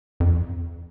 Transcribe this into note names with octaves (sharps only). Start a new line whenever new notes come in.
F2